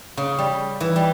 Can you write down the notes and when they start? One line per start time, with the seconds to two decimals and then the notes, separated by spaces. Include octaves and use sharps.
0.17 C#3
0.39 G3
0.81 E3
0.96 G3